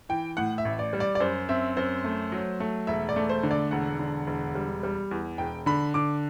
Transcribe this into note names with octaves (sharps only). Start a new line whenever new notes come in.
E3 G5
A2 F#5
E5
A1
D5
G3
D5
D5
F#2 C5
C4 E5
F#2 C5
A3
F#3
A3
E1 E5
D5
A3
C5
D3
D5
E1 F#5
D3
E1
G3
G3
E2
E1 G5
D3 B5
D3 D6